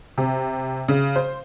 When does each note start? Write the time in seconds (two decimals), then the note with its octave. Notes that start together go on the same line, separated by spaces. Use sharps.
0.18 C3
0.88 C#3
1.16 C5